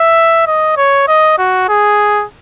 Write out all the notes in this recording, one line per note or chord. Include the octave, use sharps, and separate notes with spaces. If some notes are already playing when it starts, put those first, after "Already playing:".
Already playing: E5
D#5
C#5
D#5
F#4
G#4